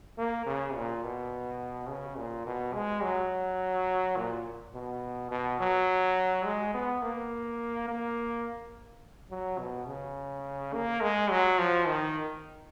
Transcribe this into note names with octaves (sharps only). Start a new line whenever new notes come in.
A#3
C#3
A#2
B2
C#3
A#2
B2
G#3
F#3
A#2
B2
B2
F#3
G#3
B3
A#3
A#3
F#3
B2
C#3
A#3
G#3
F#3
F3
D#3